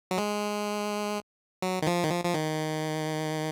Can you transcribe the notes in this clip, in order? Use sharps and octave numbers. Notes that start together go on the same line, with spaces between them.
F#3
G#3
F#3
D#3
F3
D#3
F3
F3
D#3